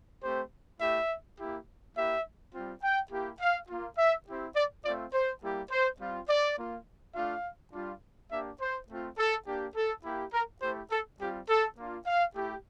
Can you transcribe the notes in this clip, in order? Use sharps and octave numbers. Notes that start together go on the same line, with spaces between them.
A3 C4 G4 C5
A3 E4 G4 E5
A#3 E4 G4
A#3 E4 G4 E5
G3 C4 F4
G5
A#3 E4 G4
F5
A#3 F4
E5
C4 E4 G4
D5
A3 C4 F4 D5
C5
G3 A#3 E4 G4
C5
G3 C4 F4
D5
A#3 F4
A3 D4 F4 F5
G3 D4 F4
A#3 D4 G4 E5
C5
A3 C4 F4
A4
A#3 D4 G4
A4
A#3 E4 G4
A#4
A3 E4 G4 C5
A4
G3 C4 F4 G4
A4
A#3 D4 F4
F5
A3 E4 G4